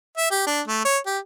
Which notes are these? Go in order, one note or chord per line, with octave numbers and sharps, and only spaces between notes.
E5
G4
D4
A3
C#5
G4